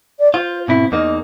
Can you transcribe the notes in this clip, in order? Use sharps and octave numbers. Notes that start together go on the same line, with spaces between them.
D5
F4 C5
G#2 B2 C4 E4
E2 A#3 D#4 D#5